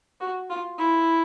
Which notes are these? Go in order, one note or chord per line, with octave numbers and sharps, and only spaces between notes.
F#4
F4
E4